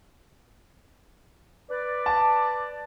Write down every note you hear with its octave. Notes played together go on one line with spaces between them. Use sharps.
B4 D5
A5